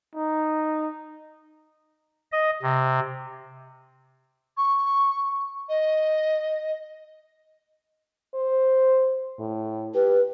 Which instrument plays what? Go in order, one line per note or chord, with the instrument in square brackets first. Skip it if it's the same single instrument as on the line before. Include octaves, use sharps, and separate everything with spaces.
[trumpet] D#4
[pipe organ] D#5
C3
[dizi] C#6
D#5
[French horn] C5
A2
[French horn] G4 [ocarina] B4